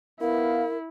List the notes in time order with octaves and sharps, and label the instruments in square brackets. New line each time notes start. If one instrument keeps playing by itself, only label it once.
[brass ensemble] B3 F5 [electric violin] E4 [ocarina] A#4